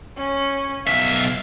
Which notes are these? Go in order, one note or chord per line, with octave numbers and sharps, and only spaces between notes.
C#4
B1 E5 F5